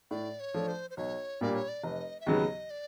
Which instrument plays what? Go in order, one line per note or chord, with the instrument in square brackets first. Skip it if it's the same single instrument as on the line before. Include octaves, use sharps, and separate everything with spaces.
[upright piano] A2 [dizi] D5
[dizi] C#5
[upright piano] F3 A3 D4
[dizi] C5
C5
[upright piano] B1 [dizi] C#5
[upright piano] A#2 G3 A#3 D4 [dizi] D5
[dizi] C#5
D5
[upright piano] F1 [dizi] D#5
[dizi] E5
[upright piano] D#2 C#3 F#3 B3 [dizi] D#5
[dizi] D5